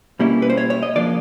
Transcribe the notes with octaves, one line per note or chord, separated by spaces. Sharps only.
B2 G3 A#3 C#4 E4
B4
C5
C#5
C#5
D#5
C#3 F3 A#3 D4 D5